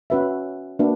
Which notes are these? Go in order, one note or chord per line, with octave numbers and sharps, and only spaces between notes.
C#4 F#4 B4 E5
A#3 D4 F#4 B4 E5